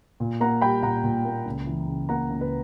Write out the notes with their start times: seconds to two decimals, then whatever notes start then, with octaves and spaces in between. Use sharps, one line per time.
0.20 A#2
0.41 A#3 F#5 A#5
0.62 G3 G5 B5
0.83 A#2 F#5 A#5
1.04 A#2
1.25 A#3
1.46 C#2
1.67 E3
1.88 C#3
2.09 A#3 F#5 A#5
2.30 C#2
2.41 B4